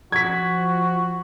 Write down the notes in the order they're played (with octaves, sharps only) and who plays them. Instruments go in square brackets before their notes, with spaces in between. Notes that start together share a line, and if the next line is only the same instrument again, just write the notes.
[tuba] F3 [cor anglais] F#4 [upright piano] G#6 B6